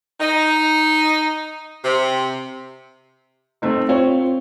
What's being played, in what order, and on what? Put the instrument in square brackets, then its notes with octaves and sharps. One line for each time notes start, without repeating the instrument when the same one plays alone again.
[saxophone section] D#4
C3
[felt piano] A3 C4 D#4
[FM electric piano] C4 F4 [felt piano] C#5